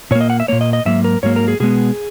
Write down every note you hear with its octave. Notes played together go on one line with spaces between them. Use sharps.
A#2 A#3 C#5
D#5
F#5
E5
A#2 A#3 C#5
D#5
D#5
G#2 F#3 A#3 E5
A#4
G#2 F#3 A#3 C#5
A#4
G#4
B2 G#3 B3 G#4